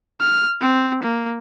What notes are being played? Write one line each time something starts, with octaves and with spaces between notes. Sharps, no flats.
F6
C4
A#3